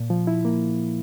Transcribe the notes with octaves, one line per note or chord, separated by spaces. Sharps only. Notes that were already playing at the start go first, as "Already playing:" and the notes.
Already playing: A#2
F3
E4
A#3